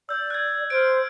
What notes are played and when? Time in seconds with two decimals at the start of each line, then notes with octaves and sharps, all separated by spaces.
0.09 D5 E6 G6
0.30 F#6 G#6
0.70 C5 F6 G6 D7